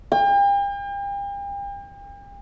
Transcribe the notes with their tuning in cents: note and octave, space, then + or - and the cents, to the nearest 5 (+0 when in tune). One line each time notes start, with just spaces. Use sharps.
G5 +40